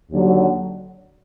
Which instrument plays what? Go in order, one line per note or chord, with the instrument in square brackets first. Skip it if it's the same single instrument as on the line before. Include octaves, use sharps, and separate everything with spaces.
[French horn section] D#2 D3 F#3